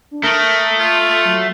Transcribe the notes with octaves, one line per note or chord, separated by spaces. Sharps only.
D4
A3 A#4 D#6
F4
F#3